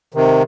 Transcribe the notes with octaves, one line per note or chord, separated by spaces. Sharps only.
C3 D#3